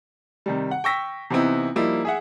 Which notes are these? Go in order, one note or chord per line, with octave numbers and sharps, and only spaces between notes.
C3 D#3 G3
F#5
G5 C#6 E6 A#6 B6
C3 E3 B3 C4 D#4 E4
F3 G3 A#3 D#4 E4
G#4 E5 F#5